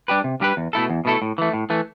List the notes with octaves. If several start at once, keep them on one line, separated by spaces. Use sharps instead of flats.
G3 D4 G4 B4
C3
G3 D4 G4 B4
E2
B2 A3 E4 A4
E2
B2 A3 E4 A4
A2
E3 A3
A2
E3 A3